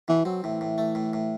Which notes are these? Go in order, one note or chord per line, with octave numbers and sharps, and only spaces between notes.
B2 E3
F#3 C4
A2 E3
A2
A3
A2
A2